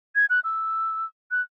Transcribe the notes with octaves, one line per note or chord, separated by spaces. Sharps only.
G#6
F#6
E6
F#6